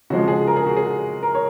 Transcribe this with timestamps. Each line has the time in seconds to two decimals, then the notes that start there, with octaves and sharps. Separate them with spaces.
0.10 C#3 F3 G#3 F#4
0.28 G#4
0.47 A#4
0.56 G#4
0.66 F#4
0.77 G#4
1.23 A#4
1.35 C#5